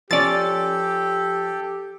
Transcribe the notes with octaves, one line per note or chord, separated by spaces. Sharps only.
F3 C#4 G4 A4 D5 A6